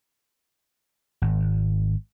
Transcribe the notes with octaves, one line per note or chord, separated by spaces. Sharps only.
G#1